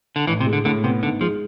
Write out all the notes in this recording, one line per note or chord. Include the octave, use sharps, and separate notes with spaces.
D3
A1 E3
C3
G#3
D3
A2 D3
C3 B3
G#1 D3
F3 G#3